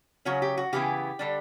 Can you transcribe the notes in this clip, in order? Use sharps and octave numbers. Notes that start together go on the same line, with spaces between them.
C#3 F#3 C#4 F#4
G4
F#4
C#3 E3 B3 E4 G4
D3 G3 D4